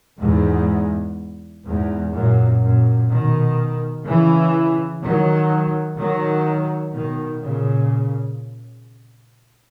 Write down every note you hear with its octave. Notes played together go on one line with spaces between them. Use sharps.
E2 G#2
E2 G#2
F#2 A#2
F#2 A#2
B2 D#3
C#3 E3
D#3 F#3
D#3 F#3
B2 D#3
A#2 C#3